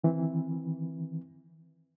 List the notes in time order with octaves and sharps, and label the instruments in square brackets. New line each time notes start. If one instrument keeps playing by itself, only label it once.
[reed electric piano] D#3 E3 C4